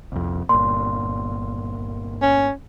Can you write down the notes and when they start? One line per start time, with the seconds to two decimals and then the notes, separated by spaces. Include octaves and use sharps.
0.12 C2 F2
0.49 G1 A#2 C6
2.22 C#4